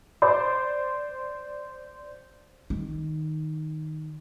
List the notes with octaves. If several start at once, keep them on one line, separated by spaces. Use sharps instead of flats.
C5 D5 C6 D6
D#3